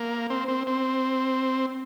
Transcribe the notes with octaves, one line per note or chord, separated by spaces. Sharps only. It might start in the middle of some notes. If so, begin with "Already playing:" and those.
Already playing: A#3
C4
C4
C4